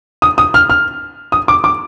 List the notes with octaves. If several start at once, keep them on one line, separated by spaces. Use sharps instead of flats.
D#6
D#6
F6
F6
D#6
D6
D6